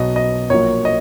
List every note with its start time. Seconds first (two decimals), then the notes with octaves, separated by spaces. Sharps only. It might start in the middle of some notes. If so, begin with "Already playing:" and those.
Already playing: B1 B2 F#3 B3 D#5
0.16 D#5
0.50 A#1 A#2 F#3 A#3 C#5
0.85 D#5